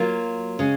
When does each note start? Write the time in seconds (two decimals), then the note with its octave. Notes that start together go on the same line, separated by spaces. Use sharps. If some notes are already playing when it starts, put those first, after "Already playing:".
Already playing: F#3 A#3 F4
0.59 C#3 G#3